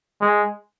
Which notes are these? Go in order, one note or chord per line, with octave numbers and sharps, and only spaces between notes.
G#3